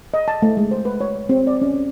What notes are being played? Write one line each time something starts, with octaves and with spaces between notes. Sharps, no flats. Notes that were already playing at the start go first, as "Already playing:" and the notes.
D#5
A5
A3
G#3
C5
B4
C#5
C#5
C4
D5
C#4
C#4